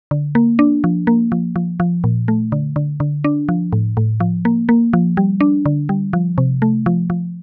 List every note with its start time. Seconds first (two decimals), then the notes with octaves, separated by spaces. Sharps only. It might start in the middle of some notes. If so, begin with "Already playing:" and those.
0.11 D3
0.35 A#3
0.59 D4
0.84 F3
1.07 A#3
1.32 F3
1.56 F3
1.80 F3
2.04 A#2
2.28 A3
2.52 D3
2.76 D3
3.00 D3
3.24 D4
3.49 F3
3.73 A2
3.97 A2
4.20 F3
4.45 A#3
4.69 A#3
4.93 F3
5.17 G3
5.41 D4
5.66 D3
5.89 G3
6.13 F3
6.38 C3
6.62 A3
6.86 F3
7.10 F3